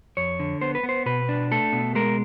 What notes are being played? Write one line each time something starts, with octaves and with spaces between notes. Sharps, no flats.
F2 C#5
D3
B3 C5
B4
B3
C5
B2 B4
D4
A3 A4
B2
G#3 A#4